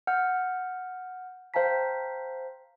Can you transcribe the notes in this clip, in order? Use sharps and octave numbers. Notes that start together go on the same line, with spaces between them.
F#5 F6 G6
C5 F5 G5 A5 A#5 B6